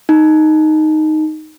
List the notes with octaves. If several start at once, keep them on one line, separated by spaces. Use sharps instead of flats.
D#4